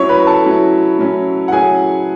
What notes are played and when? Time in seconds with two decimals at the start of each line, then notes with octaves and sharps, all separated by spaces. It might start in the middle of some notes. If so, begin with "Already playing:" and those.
Already playing: F#3 C#4 E4 C#5 C#6
0.09 B4 B5
0.27 A4 A5
0.45 F#3 C#4 E4
0.99 F#3 C#4 E4
1.48 F#5
1.52 F#3 C#4 E4 G#4 G#5